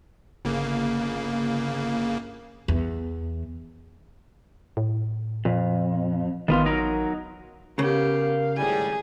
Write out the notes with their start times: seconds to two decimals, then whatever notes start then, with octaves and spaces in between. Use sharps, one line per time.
0.45 G1 C#3 A#3
2.68 E2
4.77 A2
5.45 F2 A#2
6.48 A1 D#3 B3 F4
6.66 F#3 D#4 A#4
7.79 C#3 B3 G4 A#4 F5
8.57 G#1 A2 G3 G#4 G#5